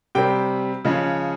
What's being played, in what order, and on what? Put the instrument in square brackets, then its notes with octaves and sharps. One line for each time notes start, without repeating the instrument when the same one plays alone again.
[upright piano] C3 G3 C4 G5
C#3 F3 G#3 C#4